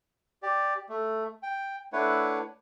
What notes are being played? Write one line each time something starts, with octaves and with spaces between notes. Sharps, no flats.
G4 D5
A3
G5
A3 D4 E4 B4 C#5 F#5